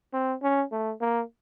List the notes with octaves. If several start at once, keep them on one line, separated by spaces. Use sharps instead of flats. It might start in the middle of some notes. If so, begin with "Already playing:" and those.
C4
C#4
A3
A#3